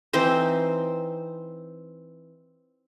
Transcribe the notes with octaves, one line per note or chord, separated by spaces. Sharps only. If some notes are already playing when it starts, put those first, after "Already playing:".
E3 C4 D#4 C5